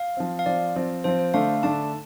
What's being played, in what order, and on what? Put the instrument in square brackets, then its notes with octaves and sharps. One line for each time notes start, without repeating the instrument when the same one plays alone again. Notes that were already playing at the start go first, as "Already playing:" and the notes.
Already playing: [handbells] F5
[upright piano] F3 C4
[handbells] F5
[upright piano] F3 C4 [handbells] D5
[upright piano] F3 C4
[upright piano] F3 C4 [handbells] C5
[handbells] C5
[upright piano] D3 A3 D4 [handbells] F5
[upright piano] D3 A3 D4 [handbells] A5